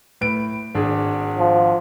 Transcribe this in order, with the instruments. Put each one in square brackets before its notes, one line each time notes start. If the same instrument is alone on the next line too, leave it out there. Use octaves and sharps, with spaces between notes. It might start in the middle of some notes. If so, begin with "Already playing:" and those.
[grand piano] A2 B4 D7
G#1 D4 G#4
[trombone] F3